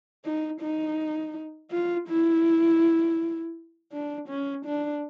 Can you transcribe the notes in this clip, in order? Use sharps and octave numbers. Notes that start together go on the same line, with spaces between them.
D#4
D#4
F4
E4
D4
C#4
D4